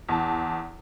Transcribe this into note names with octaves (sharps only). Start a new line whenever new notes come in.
E2 A5